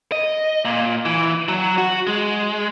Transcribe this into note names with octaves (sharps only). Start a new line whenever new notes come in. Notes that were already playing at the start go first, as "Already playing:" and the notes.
D#5
A#2
E3
F#3
F#4
G#3